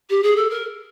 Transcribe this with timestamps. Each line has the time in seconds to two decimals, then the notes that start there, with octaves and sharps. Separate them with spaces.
0.10 G4
0.23 G#4
0.36 A4
0.50 A#4